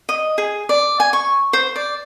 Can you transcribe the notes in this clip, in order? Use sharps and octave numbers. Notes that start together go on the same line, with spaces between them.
D#5
G#4
D5
G#5
C#6
C5
D5